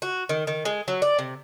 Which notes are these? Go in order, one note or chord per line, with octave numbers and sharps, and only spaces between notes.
F#4
D#3
D#3
G#3
F#3
D5
C3